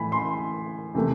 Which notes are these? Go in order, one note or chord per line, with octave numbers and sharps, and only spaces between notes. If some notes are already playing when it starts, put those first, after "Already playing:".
Already playing: A2 E3 G#5 B5
C6
C3 E3 A3